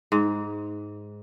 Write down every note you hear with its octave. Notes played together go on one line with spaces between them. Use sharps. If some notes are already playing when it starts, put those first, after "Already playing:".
G#2